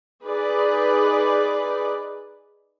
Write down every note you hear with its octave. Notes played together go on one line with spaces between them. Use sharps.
D#4 G#4 B4 D5